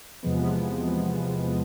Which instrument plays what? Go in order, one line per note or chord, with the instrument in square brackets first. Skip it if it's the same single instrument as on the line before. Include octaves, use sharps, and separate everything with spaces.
[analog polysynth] E2 C3 F3 G#3 B3